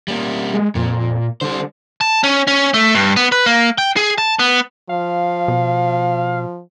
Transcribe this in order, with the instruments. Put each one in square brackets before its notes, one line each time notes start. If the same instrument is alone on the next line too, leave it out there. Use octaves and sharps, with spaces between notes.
[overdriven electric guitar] G3 A#3
[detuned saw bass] G#3
[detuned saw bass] F2 [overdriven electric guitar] A#2
[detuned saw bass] D3 [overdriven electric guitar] G3 C5
[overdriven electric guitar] A5
C#4
C#4
A3
G2
B3
B4
A#3
G5
G#4
A5
B3
[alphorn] F3 [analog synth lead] F5
[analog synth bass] B2